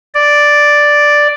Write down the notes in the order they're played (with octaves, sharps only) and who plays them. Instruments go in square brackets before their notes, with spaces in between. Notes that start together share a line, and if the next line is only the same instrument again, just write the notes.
[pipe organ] D5